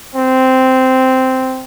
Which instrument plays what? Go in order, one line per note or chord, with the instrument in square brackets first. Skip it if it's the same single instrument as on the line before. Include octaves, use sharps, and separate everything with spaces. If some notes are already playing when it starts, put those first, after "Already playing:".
[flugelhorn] C4